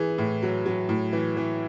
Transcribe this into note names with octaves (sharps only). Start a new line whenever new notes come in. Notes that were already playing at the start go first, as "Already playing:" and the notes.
Already playing: E3 G#4
A2
F#3
F#3
A2
E3
E3